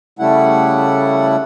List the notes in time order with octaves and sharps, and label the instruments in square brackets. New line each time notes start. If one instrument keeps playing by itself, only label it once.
[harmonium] C#3 G3 A3 E4 F#5